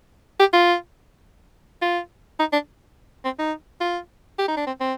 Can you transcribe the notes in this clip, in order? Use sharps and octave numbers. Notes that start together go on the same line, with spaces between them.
G4
F4
F4
D#4
D4
C4
D#4
F4
G4
D#4
D4
C4
C4